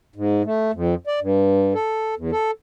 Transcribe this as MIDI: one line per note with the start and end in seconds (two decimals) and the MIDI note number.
0.16 0.42 44
0.45 0.71 57
0.74 0.95 41
1.07 1.20 74
1.21 1.74 43
1.74 2.15 69
2.17 2.31 40
2.32 2.51 69